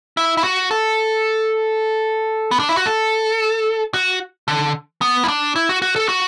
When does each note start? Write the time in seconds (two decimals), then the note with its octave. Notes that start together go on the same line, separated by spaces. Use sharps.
0.17 E4
0.37 E4
0.44 F#4
0.71 A4
2.51 B3
2.59 D4
2.69 E4
2.77 F#4
2.86 A4
3.94 F#4
4.48 D3
5.01 B3
5.24 E4
5.28 D4
5.56 E4
5.69 F#4
5.82 F#4
5.96 A4
6.09 F#4